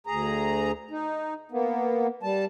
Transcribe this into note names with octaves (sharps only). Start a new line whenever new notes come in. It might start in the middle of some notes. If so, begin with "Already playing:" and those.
D2 G#4 A#5
D#4
A#3 B3
G3 A5